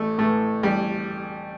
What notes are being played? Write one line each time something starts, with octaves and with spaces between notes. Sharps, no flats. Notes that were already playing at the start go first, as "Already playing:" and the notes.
Already playing: A1 A3
A2 E3 A3
A1 G3